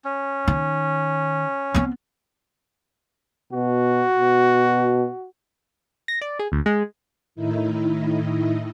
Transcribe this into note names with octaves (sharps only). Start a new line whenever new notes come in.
C#4
D#3
B3 C4
B2 F#4
B2
A#6
D5
G#4
D2
G#3
A2 D#3 D#4 E4